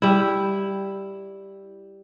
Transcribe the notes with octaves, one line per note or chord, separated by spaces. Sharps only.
G3 E4